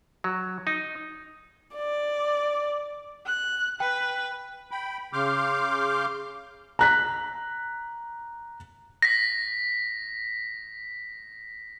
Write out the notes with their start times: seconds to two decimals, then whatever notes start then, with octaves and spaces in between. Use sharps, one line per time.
0.24 F#3
0.67 D#4
1.75 D5
3.26 F#6
3.80 B4 G5
4.71 G5 B5
5.13 C#3 C6 D6 F6 G6
6.79 A#5 F#6 B6
9.02 A#6 B6